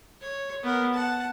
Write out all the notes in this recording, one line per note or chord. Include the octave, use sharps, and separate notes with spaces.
C#5
B3 A#4
F#5 A5